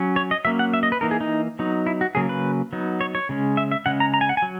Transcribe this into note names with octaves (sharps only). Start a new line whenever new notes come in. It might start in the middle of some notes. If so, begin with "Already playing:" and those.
Already playing: F#3 C#4
C#5
D#5
F#3 A#3 C#4 E5
F#5
E5
D#5
B4
E3 A#3 D#4 A#4
G#4
D#4
F#3 B3 D#4
E4
F#4
C#3 F#3 A#3 C#4 G#4
B4
F#3 B3 D#4
C#5
C#5
C#3 G#3 C#4
E5
E5
C#3 G#3 C#4 F#5
A#5
A#5
G#5
F#5
F#3 G#5